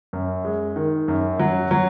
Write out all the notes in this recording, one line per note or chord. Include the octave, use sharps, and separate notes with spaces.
F#2
G#3
D#3
F#2
F#3
F#3